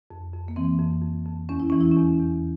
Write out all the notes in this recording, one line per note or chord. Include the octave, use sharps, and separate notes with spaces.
F2
F2
A#3
E3 C4
F2
F2
F2
E2 C#4
E4
E3 C#4
E4
E2 C#4
E2